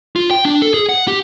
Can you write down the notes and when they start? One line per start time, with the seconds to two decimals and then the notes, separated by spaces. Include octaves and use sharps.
0.16 F4
0.31 G5
0.45 D4
0.62 A4
0.74 G#4
0.89 F#5
1.08 G4